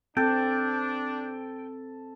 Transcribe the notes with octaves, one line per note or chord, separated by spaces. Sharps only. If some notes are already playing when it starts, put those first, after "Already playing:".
C4 D4 A4 G5